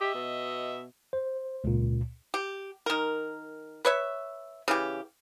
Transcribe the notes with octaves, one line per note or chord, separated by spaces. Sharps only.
G4 D#5 E5
B2
C5
C#2 A#2
G4
D#3 A#4
B4 C#5 E5
C#3 E3 G4